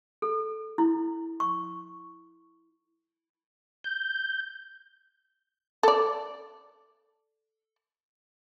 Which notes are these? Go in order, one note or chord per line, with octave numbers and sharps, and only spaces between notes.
A4
E4
C#6
G6
A4 D5